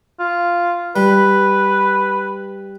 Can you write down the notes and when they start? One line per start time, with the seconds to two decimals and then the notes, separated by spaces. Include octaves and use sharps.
0.20 F4
0.96 G3 B4